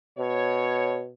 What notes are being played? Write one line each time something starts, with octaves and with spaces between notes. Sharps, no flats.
B2 C#5